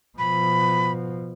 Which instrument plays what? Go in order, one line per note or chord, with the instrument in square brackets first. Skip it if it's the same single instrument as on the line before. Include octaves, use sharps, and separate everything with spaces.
[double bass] B2 F3 [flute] B5